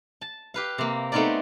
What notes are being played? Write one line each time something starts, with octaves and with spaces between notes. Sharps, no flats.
A5
G4 B4 F5
C3 A#3
A3 B3 C4 D#4 A#4 D5